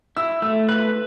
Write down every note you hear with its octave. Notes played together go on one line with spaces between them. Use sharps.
E4 E6
A3 E6
B4 F#6